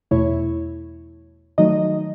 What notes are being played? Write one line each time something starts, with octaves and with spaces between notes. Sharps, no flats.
E2 B2 A3 E4 C#5
D#3 F#3 A3 D#4 D#5